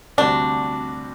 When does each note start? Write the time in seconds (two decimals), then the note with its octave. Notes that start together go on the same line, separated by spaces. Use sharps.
0.18 D2 C3 G3 C4 D4 F#4